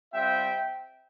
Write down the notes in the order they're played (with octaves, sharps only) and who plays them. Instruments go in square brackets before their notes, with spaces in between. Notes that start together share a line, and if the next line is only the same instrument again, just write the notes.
[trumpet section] G3 C4 F4 E5 G5